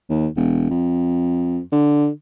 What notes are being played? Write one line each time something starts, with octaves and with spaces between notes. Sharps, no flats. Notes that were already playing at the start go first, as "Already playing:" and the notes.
D#2
E1
F2
D3